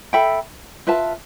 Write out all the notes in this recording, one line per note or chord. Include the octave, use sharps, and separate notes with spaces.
A4 E5 G5 B5
F4 B4 E5 A5